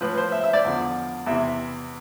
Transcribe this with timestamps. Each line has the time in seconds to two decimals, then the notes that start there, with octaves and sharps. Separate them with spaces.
0.01 A2 F3 B4
0.18 C5
0.32 E5
0.44 E5
0.53 D5
0.65 E2 D3 F3
1.26 E2 C3 E3 E5